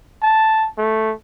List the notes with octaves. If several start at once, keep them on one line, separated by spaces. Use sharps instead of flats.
A5
A3